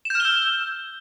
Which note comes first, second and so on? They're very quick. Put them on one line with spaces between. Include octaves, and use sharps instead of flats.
E7 G6 F6 G7 E6